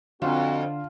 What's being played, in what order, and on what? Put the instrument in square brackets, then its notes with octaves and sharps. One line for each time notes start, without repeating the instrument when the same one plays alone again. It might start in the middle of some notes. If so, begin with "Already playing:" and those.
[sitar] F2 [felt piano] D3 [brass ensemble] C4 F#4 [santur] F4 F#5 A5